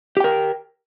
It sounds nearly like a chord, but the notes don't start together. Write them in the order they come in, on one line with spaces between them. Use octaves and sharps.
G4 G5 A#4